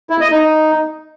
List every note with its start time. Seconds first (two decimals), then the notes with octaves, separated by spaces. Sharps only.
0.10 E4
0.21 D#5
0.31 D#4